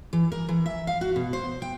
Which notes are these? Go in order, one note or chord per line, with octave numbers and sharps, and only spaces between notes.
E3
A#4
E3
E5
F5
F#4
B2
C5
G5